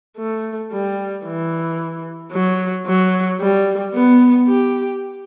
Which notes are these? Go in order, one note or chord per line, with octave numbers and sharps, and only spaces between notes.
A3
G3
E3
F#3
F#3
G3
B3
G4